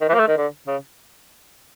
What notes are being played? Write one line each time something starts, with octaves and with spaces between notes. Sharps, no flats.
D#3
E3
A#3
A3
D#3
D3
C#3